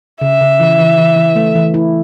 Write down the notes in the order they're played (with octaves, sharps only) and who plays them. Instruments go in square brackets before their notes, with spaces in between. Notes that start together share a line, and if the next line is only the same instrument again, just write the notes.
[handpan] C#3 [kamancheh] E5
[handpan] C#3
E3
E3
E3
E3
A3
E3
E4